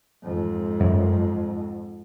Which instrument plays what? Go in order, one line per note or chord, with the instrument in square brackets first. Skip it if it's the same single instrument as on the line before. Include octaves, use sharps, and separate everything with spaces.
[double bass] F2 G#2
[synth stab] F#2